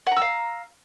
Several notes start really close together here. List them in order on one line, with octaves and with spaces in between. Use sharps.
F#5 A#5 E6 F5